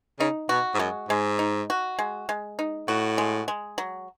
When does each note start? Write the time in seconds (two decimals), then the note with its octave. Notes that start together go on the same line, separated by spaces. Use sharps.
0.19 C#3 D#4
0.49 B2 F#4
0.74 G#2
0.79 F#2 G#3
1.09 G#2 G#3
1.39 D#4
1.70 F#4
1.99 G#3
2.29 G#3
2.59 D#4
2.88 A2 F#4
3.18 G#3
3.48 G#3
3.78 F#3